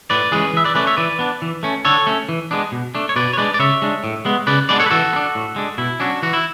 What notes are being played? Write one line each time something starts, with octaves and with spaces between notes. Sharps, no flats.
A2 B4 D5
E3 G#3 C#4 G#4 B4
E3 E5
B4 D5
A3 C#4 B4 D5
C#5 E5
E3 B4 D5
B3 D4
E3
A3 C#4
D3 A4 C#5
A3 C#4
E3
G#3 B3 D4
B2
A3 D4
C#5
B2 B4 D5
C#5
G#3 D4 B4 D5
D5
C#3 C#5 E5
G#3 D4
A2
G#3 B3
C#3 B4 D5
G#3 B3 D4 B4 D5
A4 C#5
B4
E3 F#4 A4
B3
D4
A2
G#3 D4
B2 E4
F#3 C#4 D4 F#4
E3 F#4
E4